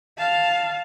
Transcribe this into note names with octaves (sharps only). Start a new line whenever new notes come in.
F5 A5